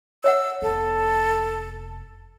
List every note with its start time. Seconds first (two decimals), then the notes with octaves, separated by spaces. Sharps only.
0.24 C#5 E5 F#5 E6
0.62 F1 B3 A4